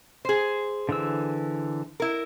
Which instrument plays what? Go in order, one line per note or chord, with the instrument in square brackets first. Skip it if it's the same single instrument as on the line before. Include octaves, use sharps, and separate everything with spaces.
[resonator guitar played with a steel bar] G#4 C5
[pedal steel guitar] D3 E3 E6
[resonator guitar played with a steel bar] E4 A#4